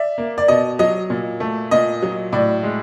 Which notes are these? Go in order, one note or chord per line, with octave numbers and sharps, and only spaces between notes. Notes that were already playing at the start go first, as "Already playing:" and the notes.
Already playing: D5 E5
A#3
D5
B2 D#5
F#3 D#5
A#2
A3
A#2 D#5
F#3
A2 D5
G#3